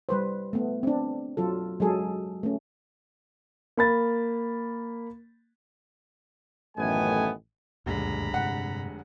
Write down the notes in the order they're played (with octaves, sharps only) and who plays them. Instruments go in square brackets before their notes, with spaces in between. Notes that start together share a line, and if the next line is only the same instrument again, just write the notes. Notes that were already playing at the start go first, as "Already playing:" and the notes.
[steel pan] G3 B4 C5
A3 B3
C4 D4
F#3 F4 A4
F#3 G#3 G#4 A4
A3 C#4
[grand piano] A#3 B5 A6
[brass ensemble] A1 F#2 D#3 A3 B3 G#5
[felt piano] F1 D3 G#3 [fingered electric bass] C#2 F#2 A#2 [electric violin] A#5 B5
[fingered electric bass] G2 C3 [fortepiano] F#5